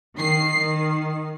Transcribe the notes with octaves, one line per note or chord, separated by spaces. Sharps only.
D#3 C7
D#3